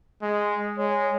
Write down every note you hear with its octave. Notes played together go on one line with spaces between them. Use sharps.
G#3
G#3 C#5